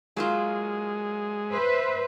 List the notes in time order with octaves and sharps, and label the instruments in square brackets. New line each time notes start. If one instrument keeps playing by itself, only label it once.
[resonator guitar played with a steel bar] F#3 A#3 F4 [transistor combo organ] G#3
[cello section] B4 C5 E5